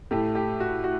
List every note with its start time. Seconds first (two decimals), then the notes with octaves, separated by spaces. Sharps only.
0.11 A2 A3 G4
0.35 G4
0.60 F#4
0.84 F#4